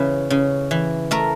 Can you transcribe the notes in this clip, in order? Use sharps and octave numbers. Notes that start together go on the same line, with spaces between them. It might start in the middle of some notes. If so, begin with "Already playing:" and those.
Already playing: C#3 E3 B4
C#3
E3
A3 A#4